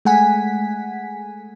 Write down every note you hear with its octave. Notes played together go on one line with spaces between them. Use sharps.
G#3 A3 F#5 G#5 B6